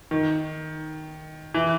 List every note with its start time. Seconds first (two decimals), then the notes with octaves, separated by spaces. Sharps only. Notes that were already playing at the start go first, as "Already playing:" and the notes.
0.11 D#3
1.54 E3